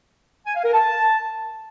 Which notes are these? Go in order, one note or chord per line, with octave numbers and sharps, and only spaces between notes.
G#5
F5
A#4
A5